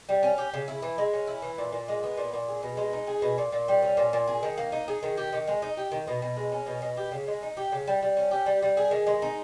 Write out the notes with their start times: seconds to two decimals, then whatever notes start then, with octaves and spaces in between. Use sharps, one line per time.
0.09 G3
0.23 C#4
0.38 G4
0.53 C#3
0.68 E4
0.82 E3
0.98 G#3
1.13 C#4
1.27 E4
1.42 E3
1.58 A#2
1.72 A#2
1.88 G#3
2.03 B3
2.17 A#2
2.33 A#2
2.48 G#4
2.63 B2
2.77 G#3
2.93 D#4
3.07 G#4
3.22 B2
3.38 A#2
3.52 A#2
3.68 G3
3.82 C#4
3.97 A#2
4.13 A#2
4.28 G#4
4.43 D#3
4.58 A#3
4.72 D#4
4.88 G#4
5.03 D#3
5.17 G4
5.33 D#3
5.47 G#3
5.62 D#4
5.77 G4
5.92 D#3
6.08 B2
6.22 B2
6.37 G#3
6.52 C#4
6.67 B2
6.82 B2
6.97 G4
7.12 C#3
7.27 G#3
7.43 D#4
7.57 G4
7.72 C#3
7.87 G3
8.02 G3
8.17 C#4
8.31 G4
8.46 G3
8.62 G3
8.77 G#4
8.91 D#3
9.07 G#3
9.22 D#4